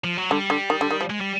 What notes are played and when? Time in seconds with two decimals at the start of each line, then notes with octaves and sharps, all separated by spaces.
0.04 F3
0.17 F#3
0.30 D3 G3
0.50 D3
0.70 D#3
0.81 D3
0.91 D#3
1.01 F3
1.10 G#3
1.21 G3